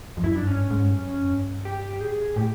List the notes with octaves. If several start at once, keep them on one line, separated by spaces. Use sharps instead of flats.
F2
F#2 E4
D4
G2
C#4
G#2
G#2
G2
F#2
F2
G2
G4
A2 G#4
A2 G4